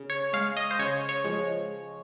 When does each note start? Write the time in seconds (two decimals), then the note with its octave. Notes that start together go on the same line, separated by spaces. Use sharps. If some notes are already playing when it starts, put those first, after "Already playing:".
Already playing: C#3
0.10 C#5
0.33 G#3 F5
0.57 D#5
0.71 C5
0.79 C#3 C#5
1.09 C#5
1.24 F3 G#3